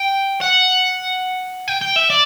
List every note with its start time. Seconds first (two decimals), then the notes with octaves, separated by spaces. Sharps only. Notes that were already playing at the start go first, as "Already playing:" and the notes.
Already playing: G5
0.41 F#5
1.68 G5
1.81 G5
1.96 E5
2.10 D5